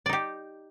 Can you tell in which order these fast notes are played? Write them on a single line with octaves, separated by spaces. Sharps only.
D5 D#4 G4